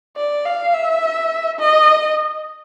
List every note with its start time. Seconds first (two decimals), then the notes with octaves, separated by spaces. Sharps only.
0.16 D5
0.45 F5
0.73 E5
1.59 D#5